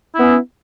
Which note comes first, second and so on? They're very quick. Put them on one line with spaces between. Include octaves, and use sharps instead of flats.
E4 B3 C#4